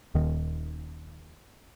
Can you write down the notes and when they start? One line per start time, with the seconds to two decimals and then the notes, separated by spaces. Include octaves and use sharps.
0.15 D#1 D#2 D#3